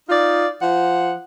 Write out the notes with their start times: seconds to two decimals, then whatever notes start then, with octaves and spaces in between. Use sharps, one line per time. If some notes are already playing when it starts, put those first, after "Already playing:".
0.08 D#4 F4 D5
0.62 F3 F#5